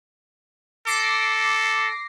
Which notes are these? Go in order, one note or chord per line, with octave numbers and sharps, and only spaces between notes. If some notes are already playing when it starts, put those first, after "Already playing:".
A4 D6 A#6 C7